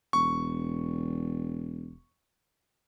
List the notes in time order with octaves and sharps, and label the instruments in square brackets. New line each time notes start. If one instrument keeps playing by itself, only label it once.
[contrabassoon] E1 [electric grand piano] C#6